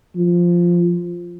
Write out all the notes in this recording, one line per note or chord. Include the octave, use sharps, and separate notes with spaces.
F3